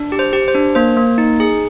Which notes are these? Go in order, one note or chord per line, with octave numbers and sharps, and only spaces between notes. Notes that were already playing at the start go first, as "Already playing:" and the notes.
Already playing: D4
G4
C5
G4
C5
D4
A#3 C5
A#3
D#4
G#4